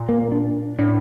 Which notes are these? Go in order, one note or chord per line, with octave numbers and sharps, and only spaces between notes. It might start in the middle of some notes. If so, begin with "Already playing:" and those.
Already playing: A#2
A#3
D4
A2 D4